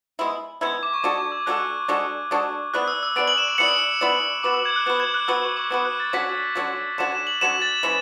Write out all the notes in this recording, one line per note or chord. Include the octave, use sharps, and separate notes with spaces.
G#3 B3 E4
G#3 B3 E4 G#6
G#6
D6
C#6
G#3 D4 F#4 A4 D6
D6
E6
G#3 D4 F#4 A4 F#6
G#3 D4 F#4 A4
G#3 D4 F#4 A4
B3 E4 G#4 D5 F#6
E6
E6
B3 E4 G#4 D5 D7
F#7
E7
D7
B3 E4 G#4 D5 C#7
B3 E4 G#4 D5
B3 F#4 B4 D6
E6
G#6
F#6
B3 F#4 B4
G#6
F#6
B3 F#4 B4 E6
C#6
D6
B3 F#4 B4 E6
F#6
A6
D3 F#3 C#4 F#4 B6
D3 F#3 C#4 F#4
D3 F#3 C#4 F#4 E7
E7
F#7
D3 F#3 C#4 F#4 E7
A6
E3 G#3 C#4 E4